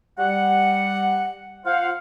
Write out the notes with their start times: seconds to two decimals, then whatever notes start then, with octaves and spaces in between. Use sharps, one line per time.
0.18 G3 F#5
1.65 F4 C5 F5 F#5